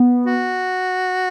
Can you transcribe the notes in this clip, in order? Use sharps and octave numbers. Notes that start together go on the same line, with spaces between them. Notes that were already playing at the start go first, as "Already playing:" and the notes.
Already playing: B3
F#4